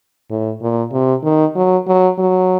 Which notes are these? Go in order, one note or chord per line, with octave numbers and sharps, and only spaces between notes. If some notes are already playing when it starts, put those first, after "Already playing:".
A2
A#2
C3
D#3
F#3
F#3
F#3